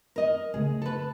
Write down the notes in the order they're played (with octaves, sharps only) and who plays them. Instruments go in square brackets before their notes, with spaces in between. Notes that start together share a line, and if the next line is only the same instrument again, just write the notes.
[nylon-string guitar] A#4 D#5
[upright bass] C#3 A3 [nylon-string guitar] G#4
[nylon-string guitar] A4 B4